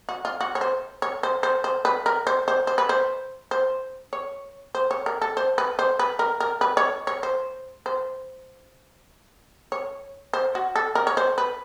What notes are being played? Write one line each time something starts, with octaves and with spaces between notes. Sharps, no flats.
F#4
F4
F#4
C#5
C5
C#5
C5
C5
C5
B4
A#4
C5
C5
C5
B4
C5
C5
C#5
C5
C#5
A#4
A4
C5
B4
C5
B4
A#4
A#4
B4
C#5
C#5
C5
C5
C#5
C5
F#4
A4
A#4
C#5
C5
B4